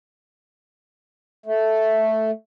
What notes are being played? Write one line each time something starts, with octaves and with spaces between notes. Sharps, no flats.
A3